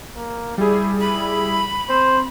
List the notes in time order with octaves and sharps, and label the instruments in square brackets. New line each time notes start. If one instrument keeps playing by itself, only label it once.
[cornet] A#3
[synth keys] G3 G#4 [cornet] E4
[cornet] E4 [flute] B5
[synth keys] C4 [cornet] C5